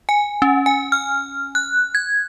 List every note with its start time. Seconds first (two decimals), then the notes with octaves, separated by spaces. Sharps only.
0.09 G#5
0.42 C#4
0.66 G#5
0.92 F6
1.55 F#6
1.95 G#6